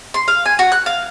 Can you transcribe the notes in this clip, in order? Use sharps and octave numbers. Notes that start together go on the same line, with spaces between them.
C6
F5
G#5
F#4
F#6
F5